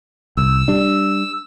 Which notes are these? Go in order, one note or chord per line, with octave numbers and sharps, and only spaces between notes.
C2 E6
G3 D4